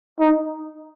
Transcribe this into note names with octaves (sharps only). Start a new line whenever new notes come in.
D#4